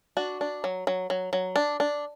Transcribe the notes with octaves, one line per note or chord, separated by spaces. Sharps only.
D4 F#4
D4
F#3
F#3
F#3
F#3
D4
D4